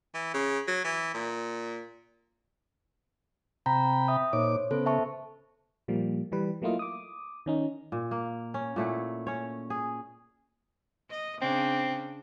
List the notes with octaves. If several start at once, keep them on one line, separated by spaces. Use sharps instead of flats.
E3
C#3
F#3
E3
A#2
C3 G5 A#5 B5
E5 D#6
A#2 D#4 C5 C#5 D6
C#3 B3 A4 C5
E5 A5 C#6
A#2 F3 G3 A#3
E3 G3 B4
F#3 A3 A#3 E4 F4 D#5
D6 D#6
D#3 C#4 D#4
A#2
A#3
C#4
A#2 A3 E4 F#5
C#4 C#5
G#4
D#5
C#3 C4 D4